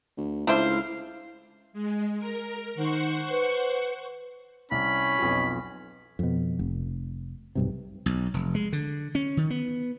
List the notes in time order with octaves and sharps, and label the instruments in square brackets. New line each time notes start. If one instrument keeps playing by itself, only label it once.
[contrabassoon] D2
[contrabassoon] C#2 [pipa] A3 D4 C5 [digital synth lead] E4 [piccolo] F5
[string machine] G#3
A#4
[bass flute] D#3 [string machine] C5 F#5 C#6
[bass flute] B4
[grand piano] C2 [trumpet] C#4 [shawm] B5
[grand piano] B1 F2 B2
[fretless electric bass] F2 B2
F1
B1 G2 C3
[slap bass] B1
F1
G#3
D3
C#4
D#3
B3